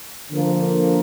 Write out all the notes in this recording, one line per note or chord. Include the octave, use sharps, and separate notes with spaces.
D3 F3 A#3